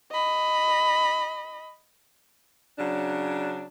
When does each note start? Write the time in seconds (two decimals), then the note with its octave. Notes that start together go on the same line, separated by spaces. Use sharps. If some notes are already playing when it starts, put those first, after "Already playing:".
0.12 D#5 B5
2.78 C#3 F#3 D4